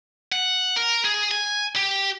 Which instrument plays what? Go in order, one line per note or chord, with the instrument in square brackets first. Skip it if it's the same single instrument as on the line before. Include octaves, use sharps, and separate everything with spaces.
[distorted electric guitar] F#5
A#4
G#4
G#5
G4